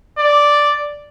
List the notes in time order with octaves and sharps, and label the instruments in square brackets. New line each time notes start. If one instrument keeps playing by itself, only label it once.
[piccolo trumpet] D5